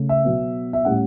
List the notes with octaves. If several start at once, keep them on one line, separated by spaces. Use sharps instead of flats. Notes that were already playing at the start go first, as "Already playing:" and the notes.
Already playing: C#3 A3
E5
B2 F#3 B3
E5
A2 G3 C#4 F#5